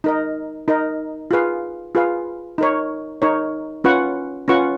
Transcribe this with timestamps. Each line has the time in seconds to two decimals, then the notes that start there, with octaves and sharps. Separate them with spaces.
0.04 D#4 A#4 D#5
0.68 D#4 A#4 D#5
1.31 F4 G#4 B4 F5
1.95 F4 G#4 B4 F5
2.58 D#4 A#4 C#5
3.22 D#4 A#4 C#5
3.84 C#4 F4 B4 F#5 C#6
4.48 C#4 F4 B4 F#5 C#6